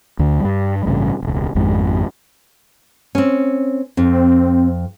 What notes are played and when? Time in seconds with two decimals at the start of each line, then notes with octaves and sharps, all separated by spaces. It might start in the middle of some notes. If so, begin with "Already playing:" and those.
0.19 D2 D3
0.40 G2 G3
0.86 A1 G2 C#3
1.22 E1 C#2
1.55 G#1 F2 G#3
3.15 C4 C#4
3.97 F2 C4